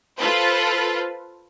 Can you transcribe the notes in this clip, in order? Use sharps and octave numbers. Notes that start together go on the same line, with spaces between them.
F4 A4 B4 C5